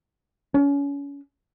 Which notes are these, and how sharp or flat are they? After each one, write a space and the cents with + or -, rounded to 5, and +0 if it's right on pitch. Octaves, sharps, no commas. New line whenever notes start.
C#4 +30